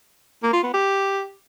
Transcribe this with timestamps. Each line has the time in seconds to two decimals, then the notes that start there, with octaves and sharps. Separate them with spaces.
0.43 A#3
0.53 F4
0.63 B3
0.74 G4